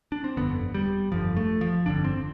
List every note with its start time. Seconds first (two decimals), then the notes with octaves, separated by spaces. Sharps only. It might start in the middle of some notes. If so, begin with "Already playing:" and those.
0.12 D4
0.24 C4
0.37 G1 F2 D3 B3
0.74 G3
1.12 G1 F2 D3 F3
1.37 A3
1.61 F3
1.86 G1 F2 D3 D4
2.04 C4